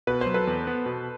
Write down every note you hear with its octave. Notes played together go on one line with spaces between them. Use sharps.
B2 B4
C5
F#3
A4 B4
E2
B3
B2